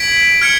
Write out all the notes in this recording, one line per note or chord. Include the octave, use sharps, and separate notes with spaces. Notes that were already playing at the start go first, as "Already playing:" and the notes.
Already playing: G#6 B6 D7 F#7
F6 G#6 C#7